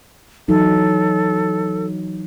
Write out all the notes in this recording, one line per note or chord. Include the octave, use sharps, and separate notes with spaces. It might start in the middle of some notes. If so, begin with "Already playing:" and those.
E3 F#3 D#4 A4